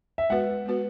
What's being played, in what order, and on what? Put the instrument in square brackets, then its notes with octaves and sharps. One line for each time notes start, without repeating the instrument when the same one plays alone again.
[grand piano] E5
[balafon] G#3 B3 F#4 B4 [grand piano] F#5
[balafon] G#3 B3 F#4 B4